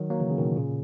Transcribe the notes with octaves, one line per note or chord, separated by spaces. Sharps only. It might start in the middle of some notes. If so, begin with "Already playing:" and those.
Already playing: D#3 F#3
F#3 A#3
C#3 E3
C#3
B2 D#3
A#2 C#3